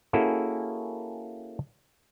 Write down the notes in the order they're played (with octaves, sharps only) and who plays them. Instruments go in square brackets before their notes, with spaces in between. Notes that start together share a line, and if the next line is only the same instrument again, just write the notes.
[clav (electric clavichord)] A#3 C#4 E4 F#4 G#4 A4